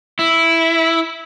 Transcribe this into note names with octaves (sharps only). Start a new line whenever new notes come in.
E4